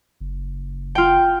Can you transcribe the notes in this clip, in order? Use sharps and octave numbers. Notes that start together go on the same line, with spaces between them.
F#1
F4 G5